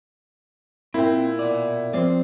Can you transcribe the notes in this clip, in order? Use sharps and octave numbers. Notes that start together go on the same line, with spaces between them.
A#2 A#3 C4 E4 G5
B2 D5
F2 C4 F4 D5